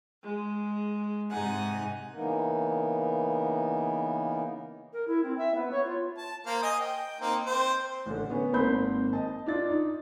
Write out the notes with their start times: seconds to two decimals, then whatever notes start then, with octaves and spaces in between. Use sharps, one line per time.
0.23 G#3
1.32 G#2 C3 D#4 F#5 G#5
2.14 C#3 E3 A#3 B3 D#4 A#4
4.93 A#4
5.07 E4
5.23 C4
5.38 E5
5.54 B3
5.71 C#5
5.84 F4
6.18 A5
6.46 A#3 C5 F5
6.63 D#5 G#5 D#6
6.79 G5
7.21 A#3 C4 D#4
7.46 C4 C5
8.06 A1 D3
8.30 B3 C#4
8.53 G#1 A#3 C4 C5 B5 G6
9.13 D#5 A5
9.46 D4 F4 A6
9.68 D#4